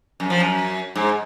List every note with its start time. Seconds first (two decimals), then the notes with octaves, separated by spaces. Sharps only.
0.20 F#2
0.30 F3
0.40 F#2
0.96 G#2